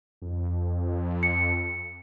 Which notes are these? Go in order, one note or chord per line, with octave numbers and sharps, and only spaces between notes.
F2
C#7